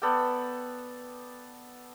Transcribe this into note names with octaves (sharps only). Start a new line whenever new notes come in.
B3 A4 D5 G5